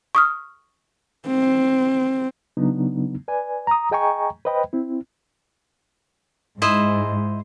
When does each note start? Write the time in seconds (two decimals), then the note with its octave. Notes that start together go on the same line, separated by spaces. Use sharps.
0.15 C#6 D#6 F6
1.28 C4
2.57 C#3 F#3 B3 D4 D#4
3.28 B4 D5 G#5
3.67 A#5 D#6
3.91 G#4 D#5 G5 G#5 A#5 C#6
4.45 B4 C5 D#5 G5 B5
4.73 C4 E4
6.62 G#2 E4 C5 D#5